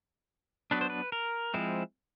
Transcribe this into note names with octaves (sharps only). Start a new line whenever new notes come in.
F#3 B3 D4 B4
C5
B4
A#4
F3 G#3 C4 E4